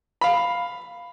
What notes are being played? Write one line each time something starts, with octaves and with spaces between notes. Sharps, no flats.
F5 B5